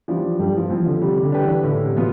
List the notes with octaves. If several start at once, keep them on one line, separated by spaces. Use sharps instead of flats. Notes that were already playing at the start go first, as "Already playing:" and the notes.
E3 F3 G3 D4
G2 G3
F3
E3 F3 C4 F4
D3
C3 G3
D3
D4 G4 B4
E3
A2 D3
C3
B2 F3 B3 F4